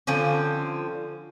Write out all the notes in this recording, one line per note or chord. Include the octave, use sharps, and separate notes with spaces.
D3 F3 C4 C#4